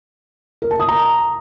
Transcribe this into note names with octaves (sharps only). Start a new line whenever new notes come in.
A#4
A5
D#6
A#5